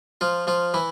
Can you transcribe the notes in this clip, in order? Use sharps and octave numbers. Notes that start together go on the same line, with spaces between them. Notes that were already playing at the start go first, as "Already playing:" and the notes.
F3 F4
F3 F4
E3 E4